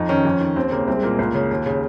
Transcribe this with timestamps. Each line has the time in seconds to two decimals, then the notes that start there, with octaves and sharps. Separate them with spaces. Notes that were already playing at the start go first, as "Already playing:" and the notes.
Already playing: F2 D#4
0.09 D#3 C#4
0.25 F2
0.40 D#3
0.56 D#2 C4
0.72 C#3 A#3
0.88 C2 C4
0.96 G#3
1.03 A#2 A#3
1.19 C#2
1.35 C#3
1.51 D#2
1.66 C#3